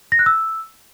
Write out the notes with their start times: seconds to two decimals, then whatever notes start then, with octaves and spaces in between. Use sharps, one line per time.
0.12 A#6
0.19 F#6
0.26 E6